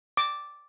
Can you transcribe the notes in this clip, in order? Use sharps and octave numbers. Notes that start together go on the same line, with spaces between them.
D6